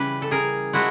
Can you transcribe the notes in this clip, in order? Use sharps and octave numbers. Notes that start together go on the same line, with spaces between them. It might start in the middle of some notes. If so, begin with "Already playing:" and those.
Already playing: C#3 E3 G3 B4
A4
G#4 A#4
F3 G#3 E4 F#4